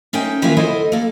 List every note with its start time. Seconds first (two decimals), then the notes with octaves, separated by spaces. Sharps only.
0.13 A3 C#4 D#4 C5 G5
0.42 D#3 E3 A#3 F4 E5
0.57 D2 E4 A4 C5 D#5
0.92 A#3 A4